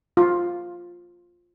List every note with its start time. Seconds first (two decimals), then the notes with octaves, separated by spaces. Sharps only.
0.17 F4